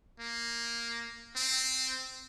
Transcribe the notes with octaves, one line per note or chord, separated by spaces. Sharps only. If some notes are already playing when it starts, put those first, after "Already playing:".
A#3
C4